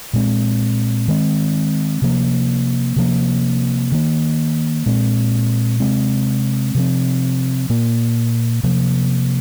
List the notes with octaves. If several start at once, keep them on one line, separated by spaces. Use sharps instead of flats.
A#2 G#3 C4
D#3 G#3 C4
C3 F3 A#3
C3 F3 A#3
D#3 A#3
A#2 G#3 C4
C3 G#3 C4
C3 F3 C4
A#2 A#3
C3 F3 A#3